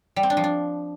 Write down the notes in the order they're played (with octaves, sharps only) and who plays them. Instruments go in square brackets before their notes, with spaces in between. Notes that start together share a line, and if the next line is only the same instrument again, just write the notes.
[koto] G3
C4
D4
F3
D4